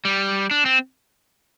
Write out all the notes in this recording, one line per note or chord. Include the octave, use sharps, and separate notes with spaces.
G3
D4
C4